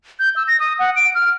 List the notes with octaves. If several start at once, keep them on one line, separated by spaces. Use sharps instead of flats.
G6
E6
A#6
D#6
F#5
D7
F6